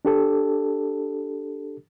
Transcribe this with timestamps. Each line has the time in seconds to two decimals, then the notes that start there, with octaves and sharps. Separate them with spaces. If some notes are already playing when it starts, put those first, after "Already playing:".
0.05 D4 G4 A4